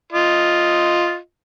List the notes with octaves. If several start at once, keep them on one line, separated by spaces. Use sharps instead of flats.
F4 D#5